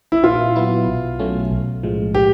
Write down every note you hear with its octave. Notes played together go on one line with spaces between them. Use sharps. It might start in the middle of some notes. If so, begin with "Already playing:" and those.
E4
A#2 F4
F#3 B3 E4
B1
B2 F#3 A3 C#4
B1
A2 F3 G#3
G4